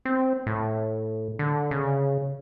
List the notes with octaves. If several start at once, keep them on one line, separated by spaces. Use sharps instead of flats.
C4
A2
D3
C#3